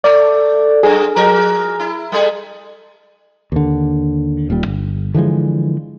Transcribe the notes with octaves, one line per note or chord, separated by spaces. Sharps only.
A3 D5
F#2 G#4
F3 A#4
E4
G3 A3 G#4
D#2 D3
D#1 A#2 G3
G1
D3 E3 F3 G#3